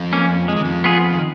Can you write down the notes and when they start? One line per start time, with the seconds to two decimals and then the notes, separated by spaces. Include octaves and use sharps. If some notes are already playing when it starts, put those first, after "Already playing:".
Already playing: F2 F3
0.13 A#3 C#4
0.48 F3 G#3
0.56 D#3
0.65 F2 F3
0.84 B3 F4 G#4
1.10 D#3